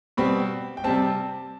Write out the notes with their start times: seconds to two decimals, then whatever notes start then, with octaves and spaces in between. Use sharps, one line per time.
0.17 B2 G3 C4 B5
0.77 G5
0.84 C3 G3 C4 A5